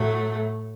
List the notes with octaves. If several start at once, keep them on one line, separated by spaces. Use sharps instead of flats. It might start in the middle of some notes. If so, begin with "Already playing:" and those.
Already playing: A2 F#3 A3